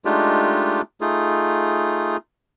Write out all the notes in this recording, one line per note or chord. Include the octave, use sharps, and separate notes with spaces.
G#3 A3 D4 D#4 F4 G4
A3 D#4 F4 G#4